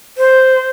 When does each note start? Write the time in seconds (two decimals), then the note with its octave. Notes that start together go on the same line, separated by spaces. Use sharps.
0.18 C5